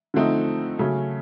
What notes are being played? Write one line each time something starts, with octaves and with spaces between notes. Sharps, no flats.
D3 F3 A3 C4 D#4
C#3 F#3 A3 C#4